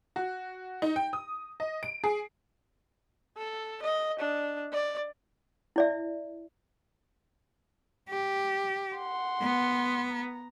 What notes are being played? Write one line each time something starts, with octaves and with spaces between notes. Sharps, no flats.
F#4
D#4
G5
D#6
D#5
D7
G#4
A4
D#5
D4
D5
E4 D5 E5
G4
F#5 C6
B3
A#5